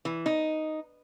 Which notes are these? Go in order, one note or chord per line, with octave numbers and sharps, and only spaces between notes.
E3
D#4